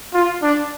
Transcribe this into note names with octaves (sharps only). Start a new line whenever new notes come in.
F4
D4